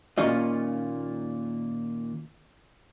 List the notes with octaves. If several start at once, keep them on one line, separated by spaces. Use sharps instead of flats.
A#2 D#3 C#4 F4 D#5